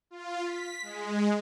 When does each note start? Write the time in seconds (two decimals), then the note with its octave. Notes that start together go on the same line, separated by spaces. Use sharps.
0.11 F4
0.43 B6
0.82 G#3